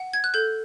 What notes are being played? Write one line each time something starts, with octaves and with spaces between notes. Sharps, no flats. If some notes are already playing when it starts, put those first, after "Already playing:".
Already playing: F#5
G#6
F#6
A4 G6